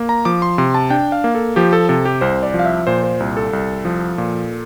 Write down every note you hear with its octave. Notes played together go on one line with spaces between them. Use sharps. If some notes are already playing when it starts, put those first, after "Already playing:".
Already playing: A#3
A#5
F3 D6
C6
C3 C6
A5
D4 G5
F5
A#3
A4
F3 G4
A4
C3 A4
G4
C2 C5
D5
F3
F5
E5
A#2 C5
C5
C2
A4
C2
F3
A#2